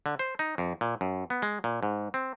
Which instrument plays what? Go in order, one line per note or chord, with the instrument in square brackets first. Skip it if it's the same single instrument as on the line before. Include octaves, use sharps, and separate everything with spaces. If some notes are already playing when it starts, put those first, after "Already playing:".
[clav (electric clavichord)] D3
C5
D#4
F2
A#2
F#2
B3
G#3
A#2
G#2
C4